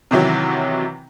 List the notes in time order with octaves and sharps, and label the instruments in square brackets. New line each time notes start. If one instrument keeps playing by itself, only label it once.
[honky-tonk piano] C3 D#3 E3 F#3